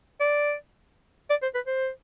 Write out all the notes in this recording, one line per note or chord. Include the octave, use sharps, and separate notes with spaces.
D5
D5
C5
B4
C5